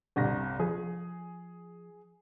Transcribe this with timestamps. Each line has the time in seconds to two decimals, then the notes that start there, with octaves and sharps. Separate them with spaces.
0.16 G1 C2 A#6
0.60 F3 G#4